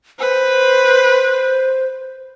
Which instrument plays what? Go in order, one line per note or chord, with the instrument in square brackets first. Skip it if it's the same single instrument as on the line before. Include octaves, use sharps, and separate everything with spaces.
[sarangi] B4 [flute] C5